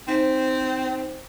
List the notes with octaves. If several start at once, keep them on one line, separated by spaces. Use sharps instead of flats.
C4 D#4 C5 B6